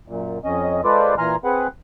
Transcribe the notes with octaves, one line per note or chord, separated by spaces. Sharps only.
F#2 A#2
F2 C#4 D#5
G#3 F4 A4 B4 C5 D5
A#2 E3 G#5 A#5 C6 F6
C4 G#4 B4 F#5